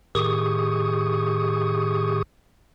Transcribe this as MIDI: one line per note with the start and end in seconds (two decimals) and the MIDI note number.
0.15 2.22 45
0.15 2.22 51
0.15 2.22 67
0.15 2.22 68
0.15 2.22 85
0.15 2.22 87